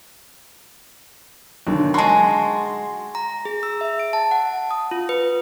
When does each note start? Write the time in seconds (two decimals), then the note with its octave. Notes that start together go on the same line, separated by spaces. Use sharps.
1.67 B1 D3 D#3
1.94 G#3 F#4 A5 C6
3.15 A#5
3.45 G#4
3.63 E6
3.81 E5
3.99 D7
4.13 A5
4.31 F#5
4.71 D#6
4.91 F4
5.09 B4